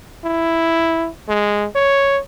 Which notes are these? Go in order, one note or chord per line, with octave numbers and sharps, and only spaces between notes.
E4
G#3
C#5